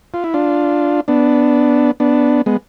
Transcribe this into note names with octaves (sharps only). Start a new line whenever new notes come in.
F4
E4
D4 F4
B3 D4
B3 D4
G#3 B3